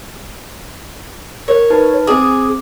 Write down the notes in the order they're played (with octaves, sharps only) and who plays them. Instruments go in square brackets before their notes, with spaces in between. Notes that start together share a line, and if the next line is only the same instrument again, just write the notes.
[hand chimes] A#4 [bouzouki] C#5
[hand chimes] D#4 B4 A5
[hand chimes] C4 D6 [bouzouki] G#4